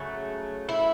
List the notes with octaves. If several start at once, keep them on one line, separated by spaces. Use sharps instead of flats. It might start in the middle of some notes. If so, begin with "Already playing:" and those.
Already playing: C#3 F#3 A3
E4